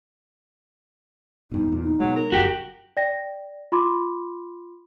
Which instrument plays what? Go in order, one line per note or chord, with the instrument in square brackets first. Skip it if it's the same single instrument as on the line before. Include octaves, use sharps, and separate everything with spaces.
[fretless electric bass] G2 B2 [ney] D#4
[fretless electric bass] E2 A#2
[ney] D#4
[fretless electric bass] B2 G#3 [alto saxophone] F#3
[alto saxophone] A#4
[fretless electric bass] F#1 F#2 C3 [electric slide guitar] F#4 G4
[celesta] D5 G5 A#6
F4 B5 C6 D6